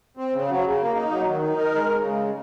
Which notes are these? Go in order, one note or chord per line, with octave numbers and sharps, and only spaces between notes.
C4
C#3
F#3
C#3
A#3
D#4
F#3
D#3
D#4
A#4
G#3
C#3
G#3